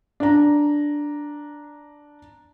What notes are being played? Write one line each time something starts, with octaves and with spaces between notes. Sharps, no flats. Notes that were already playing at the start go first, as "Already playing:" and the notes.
D4 A#5